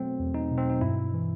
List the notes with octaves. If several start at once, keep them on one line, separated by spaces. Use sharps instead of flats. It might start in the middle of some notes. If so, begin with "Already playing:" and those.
Already playing: B2 F#3 A3 B3 C4
E2
D#4
B2
C4
D#4
G2 E4
E3